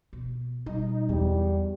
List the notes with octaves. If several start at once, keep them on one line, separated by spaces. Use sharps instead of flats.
B2
B2 G3 D#4
E2 G3 G#3